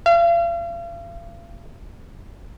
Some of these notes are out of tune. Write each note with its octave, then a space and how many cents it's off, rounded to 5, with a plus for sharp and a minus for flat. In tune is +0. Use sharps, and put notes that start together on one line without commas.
F5 -40